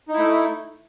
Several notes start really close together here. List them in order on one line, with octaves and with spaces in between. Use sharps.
D#4 E4 A3